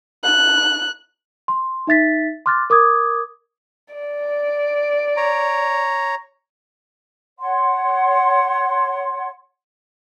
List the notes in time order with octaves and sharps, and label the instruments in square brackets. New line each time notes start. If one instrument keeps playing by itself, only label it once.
[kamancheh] F#6
[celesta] C6
D#4 E5 A6 B6
C6 D6 F6 F#6 A6
A#4 D6 D#6 G#6
[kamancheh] D5
[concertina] C#5 A#5
[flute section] C#5 F#5 C6